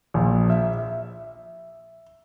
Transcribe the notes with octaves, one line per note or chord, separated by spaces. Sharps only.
A#1
E5
E5